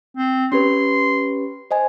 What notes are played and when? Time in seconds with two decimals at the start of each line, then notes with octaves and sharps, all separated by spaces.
0.17 C4
0.52 C#4 G4 B4 C6
1.71 C5 D#5 G#5